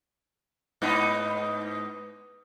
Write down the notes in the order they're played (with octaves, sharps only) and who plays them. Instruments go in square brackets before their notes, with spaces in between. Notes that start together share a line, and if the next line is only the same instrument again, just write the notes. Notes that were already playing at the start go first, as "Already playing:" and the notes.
[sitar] G#2 B3 D#4